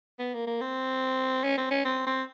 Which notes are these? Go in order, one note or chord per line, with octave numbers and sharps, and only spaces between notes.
B3
A#3
A#3
C4
C#4
C4
C#4
C4
C4